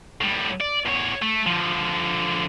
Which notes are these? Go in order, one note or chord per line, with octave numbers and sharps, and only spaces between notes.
A2 G3
D5
E2 C#5
A3
D3 F3